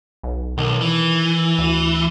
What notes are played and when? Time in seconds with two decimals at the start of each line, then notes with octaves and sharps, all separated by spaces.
0.23 B1
0.58 B1 D#3
0.81 E3
1.58 D2